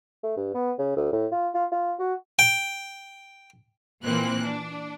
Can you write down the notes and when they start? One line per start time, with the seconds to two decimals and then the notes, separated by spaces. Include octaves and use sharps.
0.23 A3
0.37 G2
0.54 B3
0.79 C#3
0.96 D2
1.12 A2
1.32 F4
1.54 F4
1.72 F4
1.99 F#4
2.39 G5
4.04 A#2 E3 A#3 C4 F#6
4.43 D4